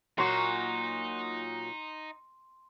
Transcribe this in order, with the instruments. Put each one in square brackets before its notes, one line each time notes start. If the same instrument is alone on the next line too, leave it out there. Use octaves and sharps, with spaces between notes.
[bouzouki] A#2 [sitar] F#3 F#4 [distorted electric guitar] D#4 [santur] C6